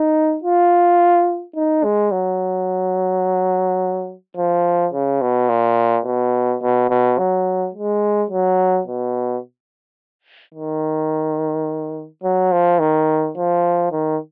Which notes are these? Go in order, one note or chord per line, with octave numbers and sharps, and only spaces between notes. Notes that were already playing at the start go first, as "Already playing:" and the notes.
Already playing: D#4
F4
D#4
G#3
F#3
F3
C#3
B2
A#2
B2
B2
B2
F#3
G#3
F#3
B2
D#3
F#3
F3
D#3
F3
D#3